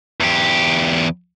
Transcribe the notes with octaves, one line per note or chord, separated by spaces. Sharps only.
E2 G4